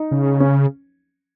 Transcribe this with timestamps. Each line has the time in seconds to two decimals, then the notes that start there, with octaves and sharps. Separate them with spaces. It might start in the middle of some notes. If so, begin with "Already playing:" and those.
Already playing: D#4
0.11 C#3
0.40 C#4